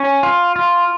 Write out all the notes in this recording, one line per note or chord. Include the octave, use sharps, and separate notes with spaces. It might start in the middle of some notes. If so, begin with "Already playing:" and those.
Already playing: C#4
F4
F4